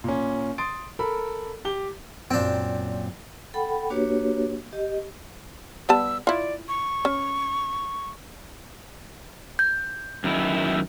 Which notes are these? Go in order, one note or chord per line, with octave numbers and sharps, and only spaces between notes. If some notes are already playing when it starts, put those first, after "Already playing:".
A#2 C#4
C6 D#6 A6 D7
A4 A#4 B5
G4 G7
F#2 A#2 C4 D4 G5
A4 F#5 G5 B5
A#3 D4 F#4 G4 B4 C#5
G4 D#5
G3 B3 A5 E6
E4 F4 D5
C#6
C#4
G6
F#2 D#3 E4